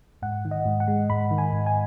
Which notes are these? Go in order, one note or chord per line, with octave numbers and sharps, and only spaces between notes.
G#2 F#5
D#3
D#5
G#2
F#5
G#3
G#2 B5
D#3
G#5
G#2
G#5